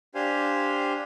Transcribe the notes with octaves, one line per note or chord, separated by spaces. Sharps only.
D4 G4 C5 F5 G#5